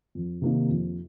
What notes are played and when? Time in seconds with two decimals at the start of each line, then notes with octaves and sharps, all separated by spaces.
0.15 F2
0.42 C3 D#3 A#3 D#4
0.69 F2